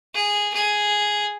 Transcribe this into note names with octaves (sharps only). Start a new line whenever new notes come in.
G#4
G#4